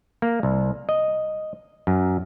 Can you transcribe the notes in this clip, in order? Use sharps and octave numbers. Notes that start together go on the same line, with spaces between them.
A#3
C2
D#5
F#2